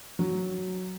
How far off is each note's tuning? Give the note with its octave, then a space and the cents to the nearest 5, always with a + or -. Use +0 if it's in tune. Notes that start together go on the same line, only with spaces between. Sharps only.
F#3 +0